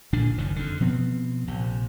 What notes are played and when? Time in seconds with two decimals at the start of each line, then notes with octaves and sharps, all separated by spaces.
0.13 A#1 A#2 D3 D4
0.38 F#1 F#2 D#3
0.56 F2 D3
0.80 B2 F3 B3 C4
1.47 A#1 C3